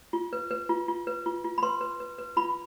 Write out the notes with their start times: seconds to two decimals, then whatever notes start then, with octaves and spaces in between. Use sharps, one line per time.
0.13 F4
0.33 B4
0.51 B4
0.69 F4
0.88 F4
1.07 B4
1.26 F4
1.44 F4
1.58 B5
1.63 B4 C6
1.81 B4
2.00 B4
2.18 B4
2.37 F4 B5